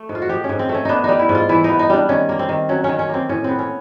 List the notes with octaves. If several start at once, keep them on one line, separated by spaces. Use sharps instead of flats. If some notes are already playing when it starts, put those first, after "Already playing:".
Already playing: A3
G#2
F4
F#4
F3 G4
C#4
G#2
C4
A3
C#4
B3 D4 D#4
G3 D#4
E4
G#2
F4
E3 E4
B3 D#4
D#4
G3 D4
D#3 C#4
A#3
C4
D#3
F#3 C#4
D#3 C#4
C#4
A#3 C4
A2 C#4
B3 C4
C#4